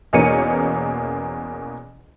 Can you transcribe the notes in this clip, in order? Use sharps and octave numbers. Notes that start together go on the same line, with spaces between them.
E2 B2 A#3 C#4 C#7 D#7